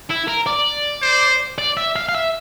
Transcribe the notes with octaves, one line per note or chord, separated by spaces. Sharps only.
E4
A#4
D5
C5
D5
E5
F5
F5
E5